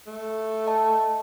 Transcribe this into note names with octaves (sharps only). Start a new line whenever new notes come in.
A3
D#5 A5